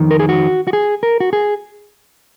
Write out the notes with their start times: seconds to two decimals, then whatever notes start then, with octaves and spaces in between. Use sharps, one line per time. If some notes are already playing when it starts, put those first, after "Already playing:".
Already playing: F2 D#3
0.11 A#4
0.20 G#4
0.29 F#4
0.67 F#4
0.73 G#4
1.03 A#4
1.20 F#4
1.33 G#4